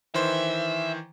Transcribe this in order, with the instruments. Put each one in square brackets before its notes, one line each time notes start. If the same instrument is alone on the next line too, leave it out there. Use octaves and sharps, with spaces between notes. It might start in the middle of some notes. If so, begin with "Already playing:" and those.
[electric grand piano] D#3 E3 C5 [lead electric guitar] E5